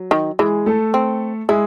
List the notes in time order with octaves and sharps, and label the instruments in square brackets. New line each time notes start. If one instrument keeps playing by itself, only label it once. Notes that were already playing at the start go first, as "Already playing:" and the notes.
Already playing: [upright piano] F#3
[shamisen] D#3
[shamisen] E3 [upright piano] G#3 G#4
[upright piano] A3 A4
[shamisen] C4
[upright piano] G#3 G#4 [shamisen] E4